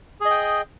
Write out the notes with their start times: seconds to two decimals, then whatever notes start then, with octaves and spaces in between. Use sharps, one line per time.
0.21 G#4
0.26 D#5
0.31 G5